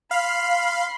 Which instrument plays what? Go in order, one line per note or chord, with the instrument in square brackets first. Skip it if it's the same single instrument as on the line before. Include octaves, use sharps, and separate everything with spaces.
[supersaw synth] F5 [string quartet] B5 C6